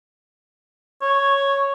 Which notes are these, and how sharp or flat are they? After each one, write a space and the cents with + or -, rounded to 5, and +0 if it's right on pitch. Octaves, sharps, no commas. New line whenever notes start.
C#5 +0